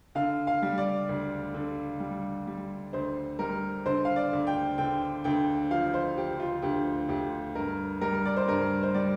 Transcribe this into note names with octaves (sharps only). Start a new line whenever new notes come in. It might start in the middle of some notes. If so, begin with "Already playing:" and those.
D3 F5
F5
G3
D5
D2
D3
G3
G3
D2 C5
G3 A#4
D3 C5
F5
D5
D2
G5
D3 G5
D2 G5
F3 F5
C5
F3 G4
F4
D2 G4
D2 G4
G2 A#4
G3 A#4
D5
C5
G2 A#4
C5
G3 D5